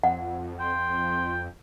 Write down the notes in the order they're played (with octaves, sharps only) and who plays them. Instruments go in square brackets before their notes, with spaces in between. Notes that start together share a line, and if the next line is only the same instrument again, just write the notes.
[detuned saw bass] F2 [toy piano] F#5
[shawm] G5 [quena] C6